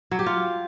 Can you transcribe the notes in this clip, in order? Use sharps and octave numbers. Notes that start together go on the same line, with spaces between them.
F#3
G4
F4